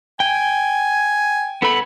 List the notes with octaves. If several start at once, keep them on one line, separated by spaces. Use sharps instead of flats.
G5 G#5
B3 A4 B5